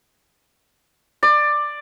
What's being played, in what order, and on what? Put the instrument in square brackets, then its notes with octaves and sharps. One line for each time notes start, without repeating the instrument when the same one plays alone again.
[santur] D5